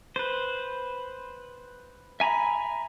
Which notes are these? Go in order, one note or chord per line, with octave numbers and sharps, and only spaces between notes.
B4 C5
E5 G#5 A#5 B5